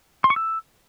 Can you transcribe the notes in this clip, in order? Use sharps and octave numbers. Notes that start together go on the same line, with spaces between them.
C6
C#6
E6